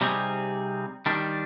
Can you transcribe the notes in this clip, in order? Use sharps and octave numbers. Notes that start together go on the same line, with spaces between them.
C3 G3 C4 D#4 G#4
D#3 G3 D4